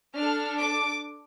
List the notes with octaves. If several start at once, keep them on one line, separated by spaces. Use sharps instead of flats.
D4 A4 F6
D6